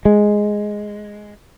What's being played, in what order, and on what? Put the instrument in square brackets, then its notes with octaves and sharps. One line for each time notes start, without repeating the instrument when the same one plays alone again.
[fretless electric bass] G#3